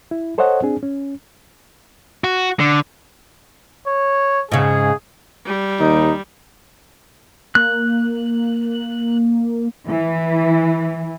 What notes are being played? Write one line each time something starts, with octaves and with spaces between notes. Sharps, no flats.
E4
A4 C5 C#5 D#5 F#5
C4 D4 G#4
C#4
F#4
D3
C#5
G#2 C#3 G#4
G3
D#2 D#4
A#3 F#6
E3